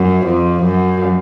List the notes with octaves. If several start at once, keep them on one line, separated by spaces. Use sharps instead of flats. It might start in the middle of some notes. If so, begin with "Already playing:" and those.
Already playing: F#2
F2
F#2